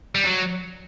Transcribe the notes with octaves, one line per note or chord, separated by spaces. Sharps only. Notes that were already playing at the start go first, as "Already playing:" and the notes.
G3
F#3